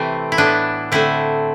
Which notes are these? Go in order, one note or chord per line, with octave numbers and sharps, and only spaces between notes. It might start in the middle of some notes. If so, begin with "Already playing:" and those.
Already playing: C3 E3 A3 C4
E4
A2 E3 B3 D4
D3 A3 C4 E4